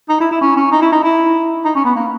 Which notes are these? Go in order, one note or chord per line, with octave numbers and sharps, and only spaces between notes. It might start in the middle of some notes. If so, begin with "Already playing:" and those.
D#4
E4
E4
C#4
C#4
D#4
E4
D#4
E4
D#4
C#4
B3
A#3